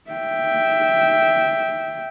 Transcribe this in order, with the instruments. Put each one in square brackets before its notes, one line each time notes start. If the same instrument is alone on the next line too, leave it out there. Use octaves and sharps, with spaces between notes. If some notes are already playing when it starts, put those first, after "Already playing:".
[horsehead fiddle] E5 G5